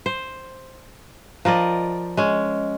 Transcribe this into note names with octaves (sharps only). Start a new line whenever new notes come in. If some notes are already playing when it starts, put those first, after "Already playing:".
C5
F3 A#4 D5 D#5
G#3 C#4